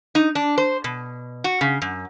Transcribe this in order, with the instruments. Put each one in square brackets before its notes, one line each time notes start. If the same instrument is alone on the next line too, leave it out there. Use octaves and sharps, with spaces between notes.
[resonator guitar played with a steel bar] D#4
D4
C5
B2
F#4
C#3
F#2